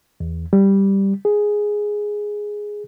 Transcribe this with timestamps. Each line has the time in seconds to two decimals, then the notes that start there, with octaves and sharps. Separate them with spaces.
0.20 E2
0.53 G3
1.25 G#4